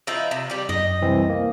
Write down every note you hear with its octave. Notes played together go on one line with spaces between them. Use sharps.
F3 D#4 E4
C3
G3 G4
F#2 D#5
C2 E3 C4
A#3